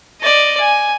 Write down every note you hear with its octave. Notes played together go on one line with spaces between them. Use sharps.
D5 D#5
G#5